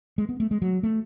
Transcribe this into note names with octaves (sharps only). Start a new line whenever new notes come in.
G#3
B3
A3
G#3
F#3
A3